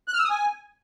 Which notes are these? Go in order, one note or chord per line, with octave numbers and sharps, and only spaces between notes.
F#6
F6
E6
D#6
G#5